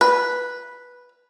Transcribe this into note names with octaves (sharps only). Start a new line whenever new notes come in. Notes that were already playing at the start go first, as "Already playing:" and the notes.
B4